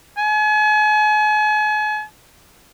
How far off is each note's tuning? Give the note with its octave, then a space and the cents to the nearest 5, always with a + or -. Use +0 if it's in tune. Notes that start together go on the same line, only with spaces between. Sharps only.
G#5 +40